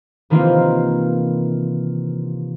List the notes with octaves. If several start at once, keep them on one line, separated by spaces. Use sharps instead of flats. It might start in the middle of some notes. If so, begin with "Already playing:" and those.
C3 D#3 E3 A#3 C4 F4